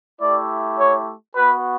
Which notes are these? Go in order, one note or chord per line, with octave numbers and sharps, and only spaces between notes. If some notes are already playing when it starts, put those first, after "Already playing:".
A3 E4 G4 D5
C#5
B3 F#4 B4